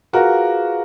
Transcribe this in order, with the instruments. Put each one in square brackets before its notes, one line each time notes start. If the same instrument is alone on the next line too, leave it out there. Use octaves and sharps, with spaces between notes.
[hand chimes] F4 G#4 B4 F5 [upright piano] F#4 A#4